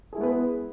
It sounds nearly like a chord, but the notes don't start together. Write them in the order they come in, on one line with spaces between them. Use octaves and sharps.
G#4 E4 G#3 B3 B4